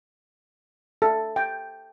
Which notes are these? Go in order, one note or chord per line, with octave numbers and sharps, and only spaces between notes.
A4
G5